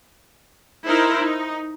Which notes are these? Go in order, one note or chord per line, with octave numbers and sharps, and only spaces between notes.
D#4 E4 A#4 C5
D#4